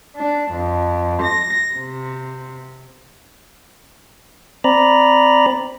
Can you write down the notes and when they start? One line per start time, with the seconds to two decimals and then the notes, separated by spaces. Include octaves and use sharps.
0.15 D4
0.50 F2
1.22 A#6
1.73 C3
4.64 C4 D5 A#5 B5